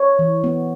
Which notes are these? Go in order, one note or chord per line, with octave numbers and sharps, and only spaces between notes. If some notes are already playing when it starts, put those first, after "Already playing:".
Already playing: C#5
E3
B3